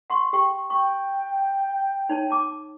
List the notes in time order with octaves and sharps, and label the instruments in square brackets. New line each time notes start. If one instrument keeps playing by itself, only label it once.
[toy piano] F#5 C6 C#6
G4 G5 C#6
[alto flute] G5 [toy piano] C#6
[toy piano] D#4 C#5 A5
A5 D6